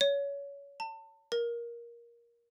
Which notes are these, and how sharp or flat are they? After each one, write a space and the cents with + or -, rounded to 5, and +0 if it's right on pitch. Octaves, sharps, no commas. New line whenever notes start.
C#5 +25
A5 +30
A#4 +15